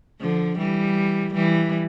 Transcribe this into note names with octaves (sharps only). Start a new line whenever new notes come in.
D3 F3
E3 G3
E3 G3